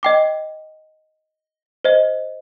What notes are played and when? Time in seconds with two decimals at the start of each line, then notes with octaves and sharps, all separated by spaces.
0.03 D#5 G5 D6
1.84 C5 D#5